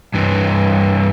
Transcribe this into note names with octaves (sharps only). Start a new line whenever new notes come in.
G2 E3